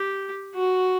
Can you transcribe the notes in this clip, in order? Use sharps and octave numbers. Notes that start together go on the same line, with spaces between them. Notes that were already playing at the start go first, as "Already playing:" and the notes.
Already playing: G4
F#4